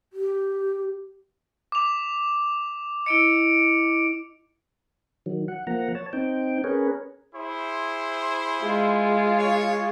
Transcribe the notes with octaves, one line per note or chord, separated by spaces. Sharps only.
G4
D6 F7
E4 D#5 C#7 D7
D#3 F#3
F#5
F3 A#3 F#5 A#5
C#5 A5
C4 D#4 G5
C#4 G#4 A#4 B4 C#5
E4 G#4 C5
G#3 F4
C#5